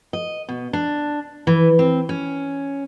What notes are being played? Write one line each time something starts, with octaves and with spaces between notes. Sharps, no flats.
D#5
B2
D4
E3
C4
C#4